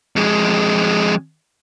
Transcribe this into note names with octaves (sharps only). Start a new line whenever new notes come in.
F2 G#3